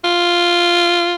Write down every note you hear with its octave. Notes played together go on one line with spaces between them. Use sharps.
F4